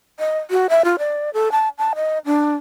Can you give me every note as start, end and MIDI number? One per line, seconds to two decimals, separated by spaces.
0.20 0.39 75
0.50 0.67 66
0.69 0.82 76
0.85 0.96 65
0.99 1.30 74
1.34 1.51 69
1.52 1.69 81
1.78 1.93 81
1.95 2.19 75
2.26 2.55 62